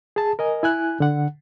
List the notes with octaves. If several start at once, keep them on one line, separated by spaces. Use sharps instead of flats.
G#4 A5
A#4 D#5 G#5
E4 G#5 F#6
D3 F#5